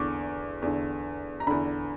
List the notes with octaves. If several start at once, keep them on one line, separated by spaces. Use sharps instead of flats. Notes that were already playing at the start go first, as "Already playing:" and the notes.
Already playing: E2 D3 C#6 D6
E2 D3
A#5
E2 D3 B5